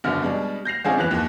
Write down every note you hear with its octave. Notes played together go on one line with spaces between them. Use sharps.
F#1 F#2 B2 D3 F6
B2 G3 G#3 D4
G6 A#6 C7 F7
D3 G#3 C4 C#4 F4 G#4
E2 E3 F3 F#6 F7
D#2